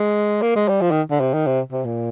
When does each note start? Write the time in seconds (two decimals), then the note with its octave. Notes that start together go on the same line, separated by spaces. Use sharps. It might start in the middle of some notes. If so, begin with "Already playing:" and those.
Already playing: G#3
0.42 A#3
0.56 G#3
0.68 G3
0.81 F3
0.91 D#3
1.11 D3
1.20 C3
1.33 D#3
1.47 C3
1.72 C3
1.85 A#2